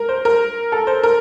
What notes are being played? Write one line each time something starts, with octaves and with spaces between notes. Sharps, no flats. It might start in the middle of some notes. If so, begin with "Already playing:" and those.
Already playing: A#4
C5
A#4
A4
C5
A#4